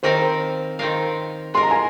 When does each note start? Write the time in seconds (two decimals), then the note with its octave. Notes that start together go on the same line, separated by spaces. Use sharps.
0.03 D#3 C4 F4 A#4 C5 F5
0.79 D#3 C4 F4 A#4 F5
1.54 G#3 F4 A#4 C6
1.63 A#5
1.71 G#5